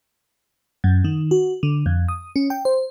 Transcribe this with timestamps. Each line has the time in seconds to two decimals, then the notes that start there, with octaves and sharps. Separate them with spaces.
0.84 F#2
1.04 D#3
1.31 F#4
1.63 D3
1.86 F2
2.08 D#6
2.36 C#4
2.50 G5
2.65 C5